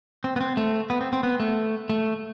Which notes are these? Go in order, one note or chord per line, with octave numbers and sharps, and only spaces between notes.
C4
B3
C4
A3
B3
C4
C4
B3
A3
A3